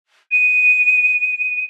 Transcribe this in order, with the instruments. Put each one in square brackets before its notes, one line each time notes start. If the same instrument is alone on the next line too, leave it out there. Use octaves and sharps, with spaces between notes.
[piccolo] D#7